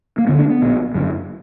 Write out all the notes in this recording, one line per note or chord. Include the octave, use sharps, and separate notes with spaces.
A#3
D2 D3 B3
D4
B3
A#1 A#2
F#1 F#2 D3